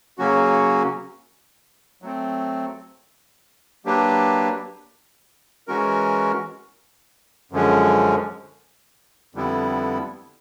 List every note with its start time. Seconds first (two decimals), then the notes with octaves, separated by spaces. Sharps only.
0.18 C#3 F#3 A#3 C#4 F#4
2.02 F#3 A3 C4
3.85 F#3 A#3 D4 G4 B4
5.68 E3 G#3 C#4 F#4 A#4
7.52 F#2 D3 F3 G#3 C#4
9.35 F2 D3 G3 B3 E4